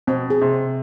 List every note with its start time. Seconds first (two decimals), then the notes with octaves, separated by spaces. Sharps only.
0.07 B2 C4
0.30 G#4
0.42 C3
0.53 C5